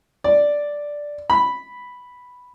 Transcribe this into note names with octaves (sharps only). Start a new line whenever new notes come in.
D5
B5